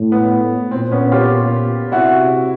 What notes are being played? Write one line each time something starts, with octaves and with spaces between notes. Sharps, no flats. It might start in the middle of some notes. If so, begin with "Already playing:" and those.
Already playing: A2
B3
A#2 C4
B3 C#4
F4 G4
C3 E4 F#4